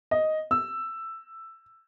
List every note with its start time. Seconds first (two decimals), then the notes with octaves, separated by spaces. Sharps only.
0.11 D#5
0.51 E6